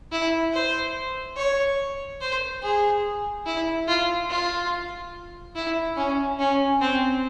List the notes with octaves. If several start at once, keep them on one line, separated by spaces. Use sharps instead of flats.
E4
C5
C#5
C5
G#4
E4
F4
F4
E4
C#4
C#4
C4